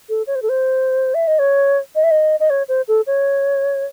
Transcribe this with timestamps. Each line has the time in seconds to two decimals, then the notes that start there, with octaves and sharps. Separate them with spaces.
0.09 A4
0.27 C#5
0.35 C5
0.42 A4
0.49 C5
1.14 E5
1.27 D#5
1.39 C#5
1.95 D#5
2.04 E5
2.11 D#5
2.40 D#5
2.50 C#5
2.68 C5
2.88 A4
3.07 C#5